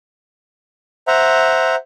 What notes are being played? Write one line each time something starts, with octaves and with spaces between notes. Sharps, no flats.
C5 E5 F#5 A#5